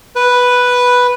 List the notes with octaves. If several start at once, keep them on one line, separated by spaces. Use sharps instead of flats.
B4